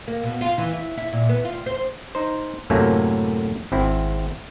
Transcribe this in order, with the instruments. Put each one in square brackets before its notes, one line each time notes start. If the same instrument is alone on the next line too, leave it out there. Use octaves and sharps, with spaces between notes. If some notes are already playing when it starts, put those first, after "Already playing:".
[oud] A#3
B2
F4
E3
E4
E4
A#2
B3
F4
C5
[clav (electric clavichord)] D#4 C5
F#2 A2 C3 A3 A#3 C#4
G#1 C4 E4